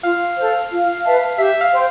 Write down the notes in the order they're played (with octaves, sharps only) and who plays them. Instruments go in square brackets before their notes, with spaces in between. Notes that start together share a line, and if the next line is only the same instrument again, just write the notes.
[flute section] F4 [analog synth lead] F5
[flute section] A4 C5
F4
B4 E5 A5
[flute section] G4 [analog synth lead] E5
[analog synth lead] F5
[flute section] C5 G5 C6